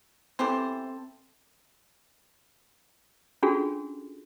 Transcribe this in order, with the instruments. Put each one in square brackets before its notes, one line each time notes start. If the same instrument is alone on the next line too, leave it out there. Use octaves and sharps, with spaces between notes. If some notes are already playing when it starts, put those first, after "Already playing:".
[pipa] E3 G4 C5 [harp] C4 A4
[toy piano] C#4 D4 F4 F#4 G#4 A4